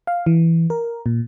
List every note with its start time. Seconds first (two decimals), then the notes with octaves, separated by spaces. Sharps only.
0.07 F5
0.26 E3
0.70 A#4
1.06 A#2